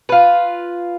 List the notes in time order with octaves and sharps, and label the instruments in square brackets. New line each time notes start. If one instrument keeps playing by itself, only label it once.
[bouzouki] F4 B4